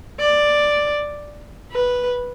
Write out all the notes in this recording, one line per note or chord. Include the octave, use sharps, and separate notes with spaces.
D5
B4